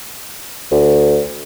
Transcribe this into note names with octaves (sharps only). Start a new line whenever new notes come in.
D2